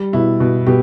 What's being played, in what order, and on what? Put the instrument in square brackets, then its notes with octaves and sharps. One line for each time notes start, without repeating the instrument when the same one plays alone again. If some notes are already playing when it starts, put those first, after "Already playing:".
Already playing: [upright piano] G3
B2 E4
B2
B2 G4